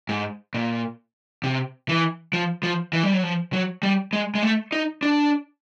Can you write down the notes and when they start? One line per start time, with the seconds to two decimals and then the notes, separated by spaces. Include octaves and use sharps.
0.09 G#2
0.54 A#2
1.44 C3
1.89 E3
2.33 F3
2.63 F3
2.93 E3
3.03 G3
3.13 F#3
3.23 F3
3.53 F#3
3.83 G3
4.13 G#3
4.35 G#3
4.43 A3
4.72 D#4
5.03 D4